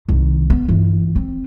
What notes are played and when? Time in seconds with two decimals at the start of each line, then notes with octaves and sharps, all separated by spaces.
0.09 C2 D#3
0.50 B3
0.68 G1 E3
1.16 C4